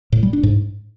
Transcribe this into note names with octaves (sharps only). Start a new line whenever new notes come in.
A2
G3
D4
G#2